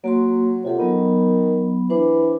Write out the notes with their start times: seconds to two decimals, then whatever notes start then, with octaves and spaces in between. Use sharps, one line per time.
0.04 F#3 A#3 F#4 C6
0.65 C3 F4 A4 F#5
0.79 D#3 F#3 B3 B5
1.90 E3 D4 C5 D6